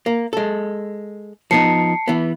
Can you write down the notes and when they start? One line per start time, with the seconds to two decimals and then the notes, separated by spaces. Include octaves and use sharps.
0.06 A#3
0.33 G#3 A4
1.51 F3 B3 D#4 A5 C7 C#7
2.08 E3 B3